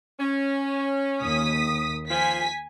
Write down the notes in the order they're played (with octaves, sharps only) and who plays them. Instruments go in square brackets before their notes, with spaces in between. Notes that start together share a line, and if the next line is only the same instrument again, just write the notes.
[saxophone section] C#4
[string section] D#2 D#6 B6
[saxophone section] F3 F4 [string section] G#5 B6